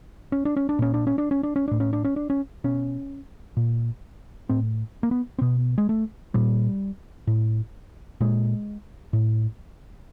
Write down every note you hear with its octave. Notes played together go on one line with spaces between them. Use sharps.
C#4
D4
C#4
D4
A#2 C#4
D4
C#4
D4
C#4
D4
C#4
A2 D4
C#4
D4
C#4
D4
C#4
B2 C#4
A#2
A2 C4
A#3
B3
C4
B2 B3
G#3
A3
A#2 G3
A2
A#2 G#3
A2